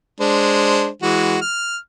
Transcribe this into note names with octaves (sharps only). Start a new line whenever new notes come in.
G#3 D4 C5
E3 G#3 F#4
F6